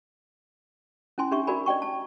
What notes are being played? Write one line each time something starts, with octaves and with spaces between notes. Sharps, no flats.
C#4 E4 G#5 C6
D4 D#4 G4 E5 C#6
F#4 A#4 D5 G#5 B5
D5 D#5 G5 C#6
A5